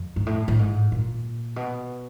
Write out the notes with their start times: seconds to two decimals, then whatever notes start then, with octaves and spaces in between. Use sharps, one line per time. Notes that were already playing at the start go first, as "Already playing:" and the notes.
Already playing: F2
0.16 G#2
0.27 A2
0.48 A2
0.59 G#2
0.92 A#2
1.56 B2